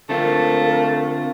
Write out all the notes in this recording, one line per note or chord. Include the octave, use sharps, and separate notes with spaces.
D3 A3 C4 F4 A#4